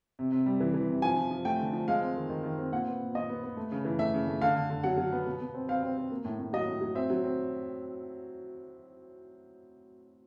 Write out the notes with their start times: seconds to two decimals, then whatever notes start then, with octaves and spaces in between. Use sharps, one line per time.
0.19 C3
0.32 C3
0.46 G3
0.60 E3
0.74 E3
0.88 C3
1.02 F3 G#5
1.16 F3
1.31 F3
1.45 A3 G5
1.60 D3
1.73 F3
1.88 G#3 F5
2.01 C4
2.16 D#3
2.30 D#3
2.43 D#3
2.58 C4
2.72 A#2 F#5
2.87 B3
3.01 A#2
3.14 A#2 D#5
3.29 B3
3.43 B3
3.57 A3
3.72 C#3
3.85 E3
3.99 A3 E5
4.14 C#3
4.28 A3
4.41 D3 F5
4.55 D3
4.70 D3
4.83 F#3 F#5
4.98 F#3
5.12 B3
5.26 B2
5.41 B2
5.54 C4
5.69 C4 F5
5.83 C4
5.98 C4
6.11 A#3
6.25 A2
6.39 A2
6.53 F#3 D#5
6.68 A2
6.81 F#3
6.95 C4 E5
7.10 F#3
7.24 C4